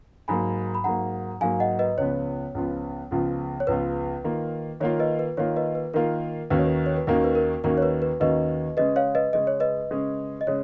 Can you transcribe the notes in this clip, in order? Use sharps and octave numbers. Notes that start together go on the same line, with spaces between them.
G#2 F#3 A#3 G#5 B5
B5
G#2 F#3 A#3 F#5 A#5
G#2 F#3 A#3 F5 G#5
D#5 F#5
B4 D#5
C#2 C#3 F3 B3 F4 C#5
C#2 C#3 F3 B3 F4
C#2 C#3 F3 B3 F4
C#5
C#2 C#3 F3 B3 F4 B4
D#3 A#3 F4
D#3 A#3 F4 C#5
B4 D#5
B4
D#3 A#3 F4 C#5
B4 D#5
B4
D#3 A#3 F4 A#4
D#2 D#3 A#3 C#4 F#4 B4
C#5
B4
C#5
B4
D#2 D#3 A#3 C#4 F#4 A#4
B4
A#4
D#2 D#3 A#3 C#4 F#4 A#4
C#5
B4
B4
D#2 D#3 A#3 C#4 F#4 B4 D#5
C#3 G#3 C#4 G#4 B4 D#5
C#5 F5
B4 D#5
C#3 G#3 C#4 G#4 D#5
C#5
B4 D#5
C#3 G#3 C#4 G#4
D#5
C#3 G#3 C#5